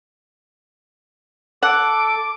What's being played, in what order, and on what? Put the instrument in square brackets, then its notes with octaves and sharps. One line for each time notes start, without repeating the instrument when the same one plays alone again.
[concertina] A4 [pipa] F#5 [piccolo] D6